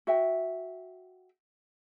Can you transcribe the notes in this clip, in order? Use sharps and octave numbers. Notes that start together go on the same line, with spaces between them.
F#4 E5 G5